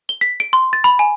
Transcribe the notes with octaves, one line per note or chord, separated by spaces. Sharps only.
G7
B6
D7
C6
A6
B5
G#5